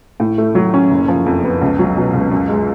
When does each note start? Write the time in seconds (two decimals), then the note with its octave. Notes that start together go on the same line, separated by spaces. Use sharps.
0.20 A2
0.38 A3
0.55 F#3
0.74 C#4
0.90 F#1
1.08 F3
1.26 F2
1.44 B3
1.61 C#2
1.79 F#3
1.97 B2
2.14 C#2
2.31 F#2
2.49 G#3